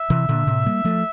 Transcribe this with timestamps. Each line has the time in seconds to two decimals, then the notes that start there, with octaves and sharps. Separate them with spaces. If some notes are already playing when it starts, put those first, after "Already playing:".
Already playing: E5
0.10 C3 E3
0.29 A#2 D3
0.47 A2 C3
0.66 G3 A#3
0.85 F3 A3